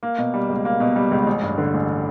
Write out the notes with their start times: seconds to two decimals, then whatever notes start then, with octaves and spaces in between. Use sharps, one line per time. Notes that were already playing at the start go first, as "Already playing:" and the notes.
0.03 A#3
0.18 B2
0.34 G3
0.49 C#2
0.65 A#3
0.80 B2
0.96 G3
1.11 C#2
1.27 A1
1.42 G2
1.58 D3
1.74 A1